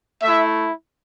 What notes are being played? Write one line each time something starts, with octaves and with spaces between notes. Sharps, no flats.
A3 E4 E5